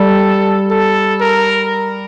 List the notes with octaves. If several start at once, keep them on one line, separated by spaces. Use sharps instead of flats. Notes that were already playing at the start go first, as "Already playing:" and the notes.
Already playing: G3 A4
A4
A#4